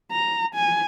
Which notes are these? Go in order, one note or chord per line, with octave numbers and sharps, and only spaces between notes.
A#5
G#5